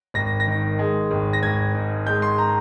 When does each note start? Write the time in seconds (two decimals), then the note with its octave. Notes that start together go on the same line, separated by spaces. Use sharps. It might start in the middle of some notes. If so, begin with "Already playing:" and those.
0.14 G#1 A#6
0.40 A#6
0.47 D#3
0.79 G#3
1.11 G#1
1.33 A#6
1.42 G#1 G#6
1.74 G#2
2.06 G#3 G6
2.22 C6
2.38 A#5